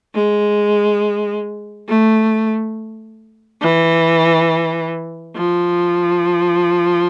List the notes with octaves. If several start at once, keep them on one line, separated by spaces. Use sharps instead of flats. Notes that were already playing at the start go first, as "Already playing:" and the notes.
G#3
A3
E3
F3